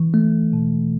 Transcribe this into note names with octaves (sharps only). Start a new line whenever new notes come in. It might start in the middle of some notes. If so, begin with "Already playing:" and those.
Already playing: E3
A3
B2